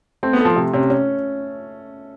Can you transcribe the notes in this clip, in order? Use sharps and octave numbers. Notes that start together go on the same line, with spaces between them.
A3 C4
B3
A4
F3
C3 A3
C3 C#4
C#4